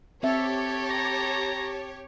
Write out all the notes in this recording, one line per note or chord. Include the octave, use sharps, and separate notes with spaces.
C4 G4 A4 C#5 E5
A#5